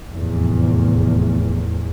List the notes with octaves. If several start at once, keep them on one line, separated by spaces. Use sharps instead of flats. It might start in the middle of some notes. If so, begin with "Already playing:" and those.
F1 E2 A2